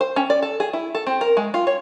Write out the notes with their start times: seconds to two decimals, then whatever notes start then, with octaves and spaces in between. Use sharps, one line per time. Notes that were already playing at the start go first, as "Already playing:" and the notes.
0.01 C5
0.16 C#4
0.30 D5
0.42 A4
0.60 G#4
0.73 E4
0.95 A4
1.07 C4
1.21 A#4
1.37 G#3
1.54 F4
1.67 C#5